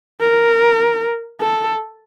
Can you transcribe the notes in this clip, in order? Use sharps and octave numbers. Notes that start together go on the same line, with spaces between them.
A#4
A4